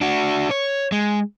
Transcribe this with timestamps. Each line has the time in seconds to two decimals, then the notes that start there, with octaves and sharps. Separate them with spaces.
0.01 D4 F#4
0.51 C#5
0.92 G#3